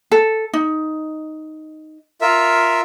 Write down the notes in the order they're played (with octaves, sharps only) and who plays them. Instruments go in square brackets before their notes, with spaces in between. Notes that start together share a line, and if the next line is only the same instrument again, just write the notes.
[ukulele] A4
D#4
[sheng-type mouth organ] F4 A#4 E5